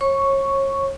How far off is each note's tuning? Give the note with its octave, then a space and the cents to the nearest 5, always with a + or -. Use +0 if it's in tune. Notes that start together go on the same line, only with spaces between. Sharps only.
C#5 -30 C#6 +0